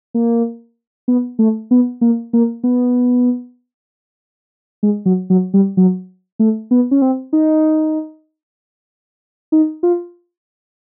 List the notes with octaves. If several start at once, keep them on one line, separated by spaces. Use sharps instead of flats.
A#3
B3
A3
B3
A#3
A#3
B3
G#3
F#3
F#3
G3
F#3
A3
B3
C#4
C4
D#4
D#4
F4